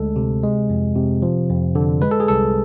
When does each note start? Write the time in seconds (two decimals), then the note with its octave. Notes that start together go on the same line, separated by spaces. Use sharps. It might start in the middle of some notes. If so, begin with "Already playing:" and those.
Already playing: D2 G#3 A4
0.16 C3
0.43 G#3
0.70 F2
0.96 C3
1.22 F3
1.50 F2
1.75 D3
2.02 G#3 B4
2.11 A4
2.20 G#4
2.28 C2 A4